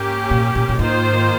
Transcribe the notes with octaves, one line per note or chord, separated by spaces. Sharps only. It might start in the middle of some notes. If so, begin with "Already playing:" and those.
Already playing: G#2 A#3 C#4 G4
A#2
A#2
A#2
G#2 D#3 A#3 F4 C5